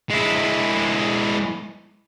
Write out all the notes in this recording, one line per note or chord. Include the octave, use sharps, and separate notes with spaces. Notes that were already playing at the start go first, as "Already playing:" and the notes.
G#3 E4